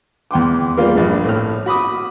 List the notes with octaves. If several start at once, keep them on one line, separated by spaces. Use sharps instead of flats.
E2 G5 C6 D6
G3 G#3 A#3 F4 A#4
A#1 G2
A2 F6
F#4 B5 D6 D#6